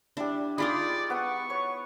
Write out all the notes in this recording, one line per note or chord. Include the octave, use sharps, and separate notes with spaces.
G3 D4 E4
D#4 F4 G#4 D5 B5
B3 B4 F#5 C#6
C#5